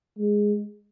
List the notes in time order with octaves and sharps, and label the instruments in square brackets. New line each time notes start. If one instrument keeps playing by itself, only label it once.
[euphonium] G#3